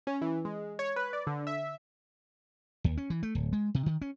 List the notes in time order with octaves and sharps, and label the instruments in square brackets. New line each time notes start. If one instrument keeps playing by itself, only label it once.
[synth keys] C#4
E3
G#3
C#5
B4
D5
D3
E5
[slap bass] D#2
C#4
E3
A3
D1
G#3
C3
D#3
C#4